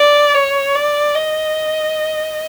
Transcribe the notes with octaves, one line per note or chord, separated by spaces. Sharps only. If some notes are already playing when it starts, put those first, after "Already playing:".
Already playing: D5
C#5
D5
D#5